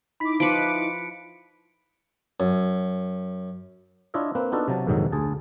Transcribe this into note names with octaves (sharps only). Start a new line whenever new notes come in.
D#4 E4 B5 D6 B6
F3 B4 C#7 D7
F#2
D4 E4 F4 C#5 D#5 E5
A#3 C4 B4
B3 D4 D#4 F4 F#4 A4
C3 F#3 A5
A#1 F2 G#2 C3 D#3 F#3
D2 G#4 A5